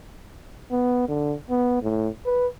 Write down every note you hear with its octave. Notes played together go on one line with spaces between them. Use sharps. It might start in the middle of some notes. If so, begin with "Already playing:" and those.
B3
D3
B3
A2
B4